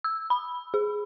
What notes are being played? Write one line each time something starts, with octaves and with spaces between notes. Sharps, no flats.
E6
B5
G#4